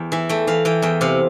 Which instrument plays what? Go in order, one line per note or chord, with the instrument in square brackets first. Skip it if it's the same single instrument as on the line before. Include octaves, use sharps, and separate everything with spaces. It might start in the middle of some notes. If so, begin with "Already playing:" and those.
Already playing: [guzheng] E2 G5
E3 E5
A3 G5
E3 F5
E3 G5
E2 G5
C3 F5